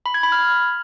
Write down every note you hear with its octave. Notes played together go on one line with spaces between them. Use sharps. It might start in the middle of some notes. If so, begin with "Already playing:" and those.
B5
G#6
B5
F6